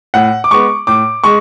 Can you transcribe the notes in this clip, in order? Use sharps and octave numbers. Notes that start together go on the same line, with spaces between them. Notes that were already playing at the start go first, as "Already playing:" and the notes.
A2 F#5
D6
G#3 B3 C#6
A2 D6
G#3 C#6